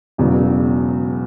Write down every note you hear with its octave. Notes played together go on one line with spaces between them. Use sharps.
E1 E2 C#3 F#3